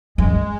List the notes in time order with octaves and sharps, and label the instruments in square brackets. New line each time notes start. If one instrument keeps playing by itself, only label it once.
[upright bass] F#2 [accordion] G#3